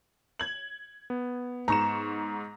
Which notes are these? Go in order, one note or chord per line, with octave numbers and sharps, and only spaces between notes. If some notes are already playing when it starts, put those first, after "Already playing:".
G#6 F#7
B3
G#2 A#5 C#6 E7